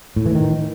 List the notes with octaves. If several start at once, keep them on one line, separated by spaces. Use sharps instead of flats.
A2
E3
D#3